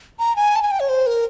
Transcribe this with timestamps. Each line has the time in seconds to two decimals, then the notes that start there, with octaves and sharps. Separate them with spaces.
0.19 A#5
0.36 G#5
0.56 A5
0.63 G#5
0.71 G5
0.80 C#5
0.89 C5
1.07 A#4